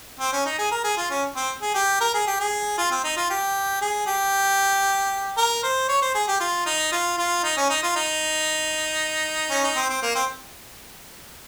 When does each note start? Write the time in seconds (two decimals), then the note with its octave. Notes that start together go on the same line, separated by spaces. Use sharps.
0.20 C4
0.33 C#4
0.46 D#4
0.59 G#4
0.72 A#4
0.84 G#4
0.97 F4
1.10 C#4
1.36 C4
1.62 G#4
1.75 G4
2.01 A#4
2.14 G#4
2.27 G4
2.40 G#4
2.78 F4
2.91 C4
3.04 D#4
3.17 F4
3.30 G4
3.82 G#4
4.07 G4
5.37 A#4
5.63 C5
5.88 C#5
6.02 C5
6.14 G#4
6.28 G4
6.40 F4
6.66 D#4
6.92 F4
7.18 F4
7.44 D#4
7.57 C#4
7.70 D#4
7.83 F4
7.96 D#4
9.51 C#4
9.64 D#4
9.76 C4
9.90 C4
10.02 A#3
10.15 C4